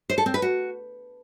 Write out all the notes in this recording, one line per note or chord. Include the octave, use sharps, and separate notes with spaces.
C5
A4
C4
B4
F#4